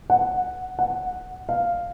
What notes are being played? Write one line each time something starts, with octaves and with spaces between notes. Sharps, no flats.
F#5
F#5
F5